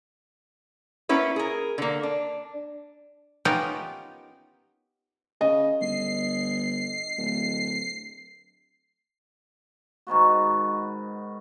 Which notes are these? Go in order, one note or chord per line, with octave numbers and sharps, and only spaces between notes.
A#3 B3 C#4 E4 B4
G#4 A#4
D3 A#3
D4
B3 C#4 D#4 F4 G4 A#4
C#3 D#5
G1 C7
D1
G#2 D#3 B3 F#4